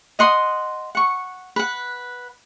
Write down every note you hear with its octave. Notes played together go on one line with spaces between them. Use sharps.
D#5 F#5 C6 D#6
F#5 C#6
B4 F#5